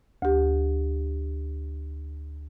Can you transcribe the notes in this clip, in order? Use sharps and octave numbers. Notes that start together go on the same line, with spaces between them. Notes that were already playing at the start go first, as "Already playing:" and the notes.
D2 G4